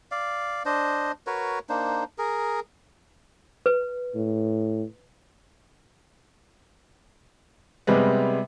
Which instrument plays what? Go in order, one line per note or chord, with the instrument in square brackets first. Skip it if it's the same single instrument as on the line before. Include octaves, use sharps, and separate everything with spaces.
[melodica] D5 F5
D4 C5 D#5
F#4 A#4 B4 C#5
A#3 D4 D#4 C5
G#4 A#4
[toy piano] B4
[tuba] A2
[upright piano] C3 G3 G#3 B3